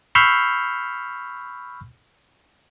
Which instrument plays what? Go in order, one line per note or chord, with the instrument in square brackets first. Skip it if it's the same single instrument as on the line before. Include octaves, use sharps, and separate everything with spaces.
[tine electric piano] B5 C#6 E6 F6 G6 C7